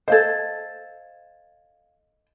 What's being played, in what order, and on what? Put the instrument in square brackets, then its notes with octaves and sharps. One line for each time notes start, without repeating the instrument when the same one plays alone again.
[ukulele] A4 C5 [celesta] D#5 F5 G#6